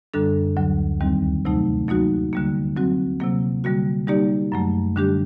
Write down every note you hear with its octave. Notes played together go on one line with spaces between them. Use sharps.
F#2 D3 G3 D4 A4
D2 D3 F#3
D#2 D#3 G3 C4
C3 F#3 A3 D#4
F#3 A#3 D#4 F#4
D3 G3 A#3
F#3 C4 F#4
C3 F#3 A#3
D3 G3 A#3 F#4
G3 A#3 D#4 G4 D5
F#2 F#3 A3
D3 G3 D4 G4